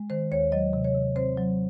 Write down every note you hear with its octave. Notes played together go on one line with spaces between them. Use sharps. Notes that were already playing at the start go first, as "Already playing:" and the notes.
Already playing: G#3
D#3 C5
D#2 C#5
F#3 D#5
C3
C#5
C3
C4 C5
F#3